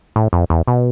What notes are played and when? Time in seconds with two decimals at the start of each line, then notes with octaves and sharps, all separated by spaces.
0.16 A2
0.33 F2
0.50 E2
0.67 B2